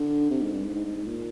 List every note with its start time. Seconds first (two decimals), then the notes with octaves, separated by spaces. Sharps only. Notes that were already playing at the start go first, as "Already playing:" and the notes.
Already playing: D3
0.30 C3
0.41 G#2
0.53 G2
0.64 G#2
0.75 G#2
0.85 G#2
0.96 G#2
1.07 A#2